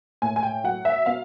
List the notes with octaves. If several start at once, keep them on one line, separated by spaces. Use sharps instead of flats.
A2 G#5
G#5
G5
F#3 F#5
E5
B3 F5